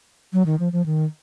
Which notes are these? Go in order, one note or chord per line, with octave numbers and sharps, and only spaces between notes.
F#3
D#3
F3
F3
D#3